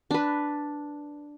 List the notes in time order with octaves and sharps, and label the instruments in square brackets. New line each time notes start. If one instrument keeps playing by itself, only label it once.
[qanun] D4 B4